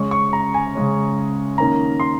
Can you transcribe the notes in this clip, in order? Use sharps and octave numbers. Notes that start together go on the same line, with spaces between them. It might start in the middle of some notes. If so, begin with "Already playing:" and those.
Already playing: C#3 G#3 C#4 C#6
C#6
A#5
G#5
C#3 G#3 C#4
D#3 A#3 C#4 A#5
C6